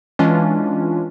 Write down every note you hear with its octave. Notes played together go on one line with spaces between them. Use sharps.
E3 G#3 C#4 D4 F4